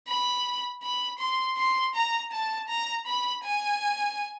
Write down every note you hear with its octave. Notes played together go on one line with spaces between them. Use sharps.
B5
B5
C6
C6
A#5
A5
A#5
B5
G#5